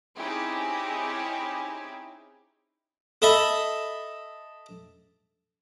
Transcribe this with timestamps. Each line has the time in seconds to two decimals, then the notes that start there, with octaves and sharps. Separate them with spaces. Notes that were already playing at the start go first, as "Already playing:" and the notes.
0.18 C4 C#4 D#4 E4 G4 G#4
3.22 A4 D#5 E5 B5